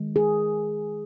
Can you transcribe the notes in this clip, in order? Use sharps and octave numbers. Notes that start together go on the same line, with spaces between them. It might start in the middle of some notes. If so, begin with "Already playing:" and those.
Already playing: D#3 G#3
G#4